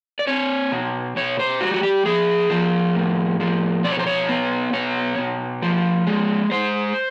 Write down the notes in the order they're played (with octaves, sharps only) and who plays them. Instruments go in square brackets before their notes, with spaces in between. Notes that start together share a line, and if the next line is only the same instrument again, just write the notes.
[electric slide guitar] D5
C4 C#5
B2
B2 C#5
C5
G3 F#4
F#4
G4
F3 G#4
F3
A2
F3
B2 D5
C#5
C5
C#5
B3
B2 C#5
B2
F3
G#3
G#3 C5